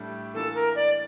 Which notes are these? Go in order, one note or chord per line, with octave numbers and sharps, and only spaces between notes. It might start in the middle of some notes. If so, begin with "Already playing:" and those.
Already playing: A2 G3 D4 A4
E3 A#3 D4 F4 A4
A#4
D5